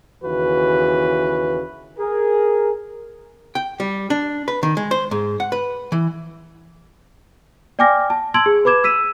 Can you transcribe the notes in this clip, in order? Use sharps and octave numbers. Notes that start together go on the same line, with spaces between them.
D#2 C#3 E3 F#4 B4
G#4 A#4
G5
G3
D4
B4
D#3
G#3
C5
G#2
F#5
B4
E3
D5 G5 G#5 D6 F6 A#6
A5
A5 C6 E6 G#6 D7 F#7
G#4
B4 B5 D6 G#6 E7
E6 B6 D#7 E7